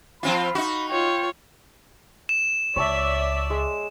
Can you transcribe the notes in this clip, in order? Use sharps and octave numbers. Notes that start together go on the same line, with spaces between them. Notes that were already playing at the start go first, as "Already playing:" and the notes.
F3 C4 F4 B5
D#4 F#4
F4 C#5 G5
E7
C#2 C#5 D5 E5 A5 E6
G#3